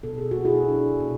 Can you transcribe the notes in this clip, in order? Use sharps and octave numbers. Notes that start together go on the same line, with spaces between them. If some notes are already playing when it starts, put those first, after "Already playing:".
B2 A4
G#4
B2 F#4
E4 G#4
D4
B2